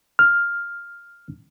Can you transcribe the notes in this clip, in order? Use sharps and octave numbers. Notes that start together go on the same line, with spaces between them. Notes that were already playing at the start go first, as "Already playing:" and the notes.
F6